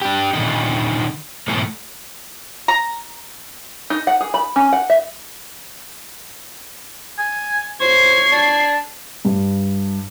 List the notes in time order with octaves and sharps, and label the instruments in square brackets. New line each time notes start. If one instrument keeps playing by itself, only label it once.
[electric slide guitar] D4 G4
A#2 D3 D#3 G#3 D#4
G#2 B2 E3 A3
[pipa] A#5
[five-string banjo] D#4
F#5
G#4
B5
C#4
F#5
E5
[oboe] G#5
[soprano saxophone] C5 [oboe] C#5 [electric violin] G#6 C7
[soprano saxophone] D4
[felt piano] G2